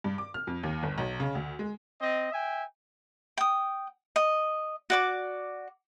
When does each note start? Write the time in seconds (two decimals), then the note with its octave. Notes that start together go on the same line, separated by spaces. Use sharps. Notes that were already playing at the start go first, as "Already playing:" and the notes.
0.04 G2
0.18 D6
0.34 F6
0.47 F2
0.63 D#2
0.83 G1
0.98 B1
1.20 C#3
1.35 D2
1.59 G#3
2.01 C4 D#5
2.32 E5 G5 G#5
3.38 G5 D#6
4.16 D#5
4.90 F#4 D5 D6